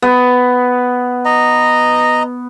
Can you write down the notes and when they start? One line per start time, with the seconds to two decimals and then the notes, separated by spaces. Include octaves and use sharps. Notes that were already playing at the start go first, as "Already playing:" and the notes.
0.02 B3
1.25 D#5 A#5